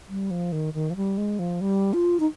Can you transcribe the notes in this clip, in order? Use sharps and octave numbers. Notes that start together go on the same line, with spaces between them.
G3
F3
D#3
D#3
F3
G3
G#3
F3
G3
F4
D#4